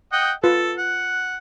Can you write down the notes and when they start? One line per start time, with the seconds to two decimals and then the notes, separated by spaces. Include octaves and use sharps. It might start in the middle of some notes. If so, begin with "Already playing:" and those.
0.12 D#5 F#5 G5
0.44 F4 A4 B4
0.77 F#5